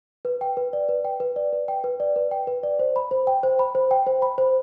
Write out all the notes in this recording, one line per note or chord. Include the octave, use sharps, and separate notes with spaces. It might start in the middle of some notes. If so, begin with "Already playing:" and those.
B4
G5
B4
D5
B4
G5
B4
D5
B4
G5
B4
D5
B4
G5
B4
D5
C5
B5
C5
G5
C5
B5
C5
G5
C5
B5
C5